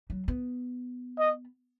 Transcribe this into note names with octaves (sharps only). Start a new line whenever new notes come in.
F#3
B3
D#5